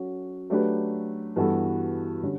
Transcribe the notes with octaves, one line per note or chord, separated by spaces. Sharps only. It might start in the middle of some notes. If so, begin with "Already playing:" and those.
Already playing: F#3 C#4 F#4 A4
F#3 A3 D4 G4 B4
G2 E3 B3 F#4 A4
D3 G3 C#4